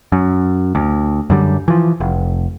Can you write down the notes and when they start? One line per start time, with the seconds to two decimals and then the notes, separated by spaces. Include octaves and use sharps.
0.12 F#2
0.75 D2
1.30 F#2 D3 G3
1.68 E3 F3
2.00 F1